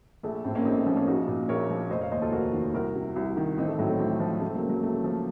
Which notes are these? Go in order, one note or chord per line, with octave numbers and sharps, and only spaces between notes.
A#1 A3
A2 A3 C4
A#3 C#4
A#1 C4 D#4
A3
F3 A#3 C#4
A#3 C#4
A#1 D#4 F#4
A#2
A#1 A#4 C#5
F3
F1 C5 D#5
C#5 F5
D#2 C5 D#5
F4 A4
F1 F#4 A#4
D#3
C2 F#4 A#4
C3
C2
D#3
A1 C4 D#4
A3
A2 F#3
A3 C4
A1 A3 C4
F3
C#2 A3 C4
F#3 A#3
C#3
F#3
C#2 A3
F3